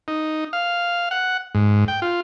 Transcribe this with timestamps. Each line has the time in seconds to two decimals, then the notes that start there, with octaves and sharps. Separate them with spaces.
0.08 D#4
0.53 F5
1.11 F#5
1.55 G#2
1.88 G5
2.02 F4